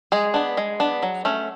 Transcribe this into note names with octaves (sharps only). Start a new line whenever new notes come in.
G#3 G#4
B3 D4
G#3
B3 D4
F#3
A3 C#4